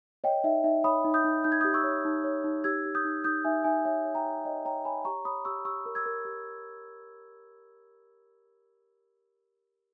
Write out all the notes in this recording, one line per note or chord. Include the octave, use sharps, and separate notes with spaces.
C#5 D#5 G5
D#4 E5
D#4 E5
C#5 B5 D#6
D#4
D#6 G6
D#4
D#4 G6
G#6
G4 D#6 G6
C#6 E6
C#5
D#4
C#5
D#4
G4 E6 G#6
G4
D#6 G6
D#4
D#4 D#6 G6
D#4 E5 G#5
D#4 E5 G#5
C#5 E5 G#5
C#5
G5 A#5
C#5
C#5 D#5 G5
C#5 G5 A#5
C#5 G#5 B5
G4 A#5 C#6
C#5 B5 D#6
G4 C#6 E6
G4 C#6 E6
A#4
E6 G#6
A#4
G4